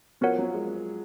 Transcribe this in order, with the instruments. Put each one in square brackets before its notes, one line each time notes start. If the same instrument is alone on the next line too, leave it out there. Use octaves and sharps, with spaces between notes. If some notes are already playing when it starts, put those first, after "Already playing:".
[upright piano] F3 [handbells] B3 F#4 A#4 C#5 F#5
[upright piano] F#3
G#3